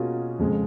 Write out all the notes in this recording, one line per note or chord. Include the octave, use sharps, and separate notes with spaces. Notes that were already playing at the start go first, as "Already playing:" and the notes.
Already playing: B2 A#3 C#4 F4 F#4 G#4
F2 C#3 G#3